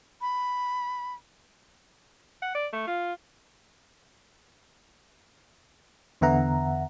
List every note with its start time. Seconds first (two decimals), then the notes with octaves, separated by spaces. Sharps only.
0.21 B5
2.42 F#5
2.55 D5
2.73 A3
2.87 F4
6.21 E2 D3 B3 E5 F#5 A#5